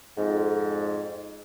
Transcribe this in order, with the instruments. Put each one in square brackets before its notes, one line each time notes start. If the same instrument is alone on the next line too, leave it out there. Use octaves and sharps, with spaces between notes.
[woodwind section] F2 G#2